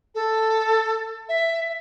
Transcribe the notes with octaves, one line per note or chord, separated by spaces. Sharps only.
A4
E5